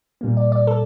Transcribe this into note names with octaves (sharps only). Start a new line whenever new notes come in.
A#2 G3 A#3
D5
D5
A4